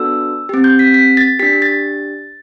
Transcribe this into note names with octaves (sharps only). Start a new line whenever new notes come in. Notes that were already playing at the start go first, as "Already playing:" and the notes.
Already playing: B3 D4 F#4 A4 E6
C4 G4
G6
B6
B6
A6
D4 G4 B6
A6